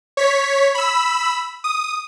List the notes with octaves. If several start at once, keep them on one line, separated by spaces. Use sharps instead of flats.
C#5 B6
B5 E6
D#6